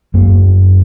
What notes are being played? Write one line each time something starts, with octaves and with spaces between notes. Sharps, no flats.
F#2 A#3